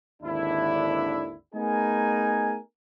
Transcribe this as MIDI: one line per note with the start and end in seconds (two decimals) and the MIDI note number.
0.22 1.35 32
0.22 1.35 39
0.22 1.35 50
0.22 1.35 62
0.22 1.35 64
1.55 2.56 57
1.55 2.56 59
1.55 2.56 63
1.55 2.56 68
1.55 2.56 70
1.55 2.56 80